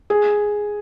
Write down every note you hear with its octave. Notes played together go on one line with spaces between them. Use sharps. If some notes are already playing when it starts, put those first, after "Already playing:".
G#4